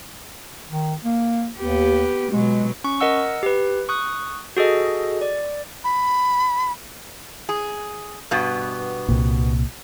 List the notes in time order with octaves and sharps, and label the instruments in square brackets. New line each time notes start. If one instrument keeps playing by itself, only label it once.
[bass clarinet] D#3
A#3
[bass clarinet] D#2 [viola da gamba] B3 G4
[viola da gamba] B2 F#3 [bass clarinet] G#3
[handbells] C#4 C#6
A#4 D#5 F#5 E6
G4 B4
C#6 D#6 F#6
F#4 G#4 A4 D#5
D5
[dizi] B5
[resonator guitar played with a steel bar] G#4
G2 B2 B3
[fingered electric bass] C2 A#2